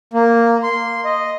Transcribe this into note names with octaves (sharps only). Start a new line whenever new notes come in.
A#3
C6
D#5